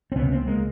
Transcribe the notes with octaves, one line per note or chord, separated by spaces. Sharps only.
C4
C#2 C3 B3 C#4
A#3 C4
B3
G#3 A#3